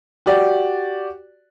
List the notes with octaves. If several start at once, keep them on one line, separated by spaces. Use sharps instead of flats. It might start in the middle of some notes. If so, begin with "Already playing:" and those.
F#4 G4 D5